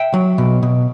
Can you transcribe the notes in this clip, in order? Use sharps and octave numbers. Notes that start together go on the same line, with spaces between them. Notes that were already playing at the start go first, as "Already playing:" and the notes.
Already playing: E5 G5
F#3
B2
B2